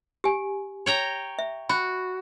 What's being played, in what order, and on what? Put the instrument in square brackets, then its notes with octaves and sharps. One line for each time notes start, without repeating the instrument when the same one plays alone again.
[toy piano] G4 G#5
[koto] C#5 G5 A#5
[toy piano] E5
[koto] F#4 [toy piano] B5